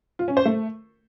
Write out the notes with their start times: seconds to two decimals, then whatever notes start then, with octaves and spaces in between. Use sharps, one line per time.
0.19 F4
0.28 C#4
0.37 C5
0.45 A3